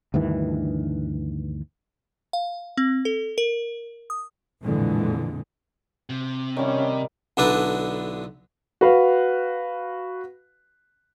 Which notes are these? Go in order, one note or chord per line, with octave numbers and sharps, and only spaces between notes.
D2 G2 D#3 E3
F5
C4
A4
A#4
D#6
A#1 F2 A2 D3 E3 G#3
C3
D#3 G3 C#4
B1 D3 D4 E4 B4 A#5
F#4 B4 F5